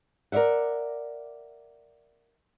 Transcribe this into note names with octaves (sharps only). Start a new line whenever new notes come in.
A#4 C5 D5 E5 F#5